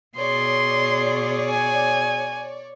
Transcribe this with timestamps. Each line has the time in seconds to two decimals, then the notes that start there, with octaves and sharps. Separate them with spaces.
0.17 B2 G#4 C#5 D5 C6
1.50 G#5